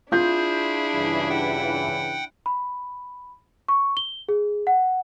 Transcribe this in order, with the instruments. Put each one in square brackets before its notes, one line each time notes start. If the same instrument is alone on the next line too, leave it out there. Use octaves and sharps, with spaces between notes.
[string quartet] D4 E4 [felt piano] F4 G6 [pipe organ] G#4
[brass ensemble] G2 C#3 E3
[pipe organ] F#5 G5
[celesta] B5
C#6
G7
G#4
F#5